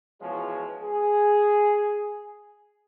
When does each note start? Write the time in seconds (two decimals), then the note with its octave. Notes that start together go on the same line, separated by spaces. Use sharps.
0.21 B2 E3 F3 G#3 C#4 G#4
0.83 G#4